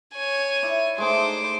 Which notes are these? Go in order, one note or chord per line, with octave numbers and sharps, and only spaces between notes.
C#5 G#5
E4 D5
G#3 A3 D#4 C5 D6